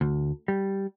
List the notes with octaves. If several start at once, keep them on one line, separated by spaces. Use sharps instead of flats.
D2
G3